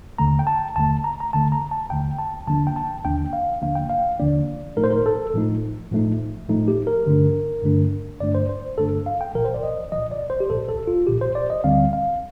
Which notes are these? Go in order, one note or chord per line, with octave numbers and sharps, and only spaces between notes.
D#2 D3 A3 A#5
G5
A5
D#2 D3 A3 A5
A#5
A#5
D#2 D3 A3 A5
A#5
A5
D#2 D3 A3 G5
A5
D#2 D3 F3 A#3 D4 A5
G5
A5
D#2 D3 F3 A#3 D4 G5
F5
D#2 D3 F3 A#3 D4 F5
G5
F5
D#2 D3 F3 A#3 D4 D5
A2 F3 A3 D#4 A#4
C5
A#4
A4
A2 F3 A3 D#4
A2 F3 A3 D#4
A2 F3 A3 D#4
G4
A#4
G2 D3 A3 D4
G2 D3 A3 D4
G2 D3 A3 D4 D5
C5
C5
G2 D3 A3 D4 A4
F5
G5
C2 A#2 F3 A#4
C5
D5
D#5
C2 A#2 F3 D#5
D5
C5
G4
C2 A#2 F3 A4
A4
F4
C2 A#2 F3 G4
C5
D5
D#5
D2 D3 G3 C4 F5
F5